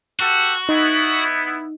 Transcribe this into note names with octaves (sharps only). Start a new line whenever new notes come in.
F#4 G4 A4 F#5
B3 D#4 E4